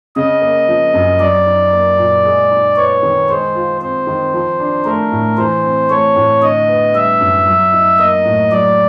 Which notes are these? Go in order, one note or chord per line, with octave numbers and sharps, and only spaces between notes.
C#3 D#5
A#3
F3
F#2
F#3 D5
D#4
A#3
A#2
G#3
D#4
B3 C#5
D#3
G#3 C5
F4
C4 C5
D#3
F3
D4
A3 A#4
A2
E3 C5
C4
A3 C#5
A2
D3 D#5
B3
G3 E5
F#2
F#3
D#4
A#3 D#5
A2
F#3 D5